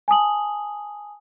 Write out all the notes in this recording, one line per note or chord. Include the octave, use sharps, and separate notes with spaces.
G#5 A5 D#6 F#7